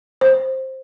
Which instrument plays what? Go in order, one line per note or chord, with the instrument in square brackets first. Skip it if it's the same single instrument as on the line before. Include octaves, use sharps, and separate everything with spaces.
[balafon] C5